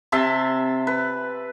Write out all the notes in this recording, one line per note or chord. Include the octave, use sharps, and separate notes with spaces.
C3 E5 A5 C6
B4